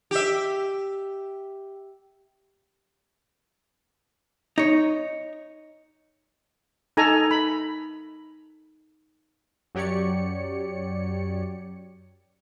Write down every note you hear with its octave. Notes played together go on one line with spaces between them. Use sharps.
G4 E5
D#4 C#5
D#4 A4 G#5 A#5
B5
F#2 F#3 G4 C#5 D5 C#7